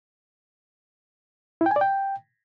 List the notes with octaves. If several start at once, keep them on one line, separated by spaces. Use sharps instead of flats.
E4
G5
G#5
D5
G5